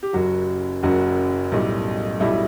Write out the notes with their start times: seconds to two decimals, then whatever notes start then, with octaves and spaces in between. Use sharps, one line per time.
0.03 G4
0.13 F#1 F#2 F#3 F#4
0.83 F#1 F#2 F#3 F#4
1.52 B1 A2 G3
2.20 B1 A2 G3 E4